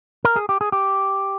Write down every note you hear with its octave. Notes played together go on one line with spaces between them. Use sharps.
A#4
G#4
G4
G#4
G4